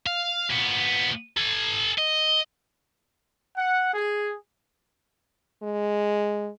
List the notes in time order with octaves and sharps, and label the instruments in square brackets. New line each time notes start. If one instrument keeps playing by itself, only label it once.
[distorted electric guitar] F5
A#2 B3
A4 G#5
D#5
[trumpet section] F#5
G#4
[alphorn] G#3